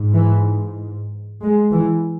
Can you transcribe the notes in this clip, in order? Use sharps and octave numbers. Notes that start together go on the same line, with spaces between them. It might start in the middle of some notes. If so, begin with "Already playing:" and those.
Already playing: G#2
E3
G#3
E3